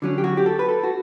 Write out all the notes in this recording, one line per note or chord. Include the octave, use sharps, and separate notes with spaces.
D3 F#3 C#4
G4
F#4
G4
A4
B4
A4
F#4